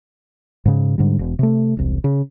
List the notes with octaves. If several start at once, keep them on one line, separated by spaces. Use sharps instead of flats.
G#2 C#3
G#2 D3 G3
E1
C3 A3
E1 C2
C#3